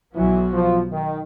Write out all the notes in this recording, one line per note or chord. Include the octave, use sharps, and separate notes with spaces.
B1 B2 E3 F#3 B3
F3
D#3